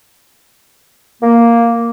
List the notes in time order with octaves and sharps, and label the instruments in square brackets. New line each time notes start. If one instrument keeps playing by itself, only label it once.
[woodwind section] A#3